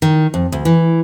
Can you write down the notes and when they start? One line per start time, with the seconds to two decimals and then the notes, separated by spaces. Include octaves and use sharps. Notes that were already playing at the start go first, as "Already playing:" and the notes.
0.02 D#3
0.34 F2
0.52 D2
0.65 E3